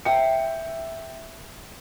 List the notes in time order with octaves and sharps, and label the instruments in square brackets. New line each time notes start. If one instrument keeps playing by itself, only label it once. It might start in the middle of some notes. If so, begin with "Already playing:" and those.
[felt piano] E5 G5 C#7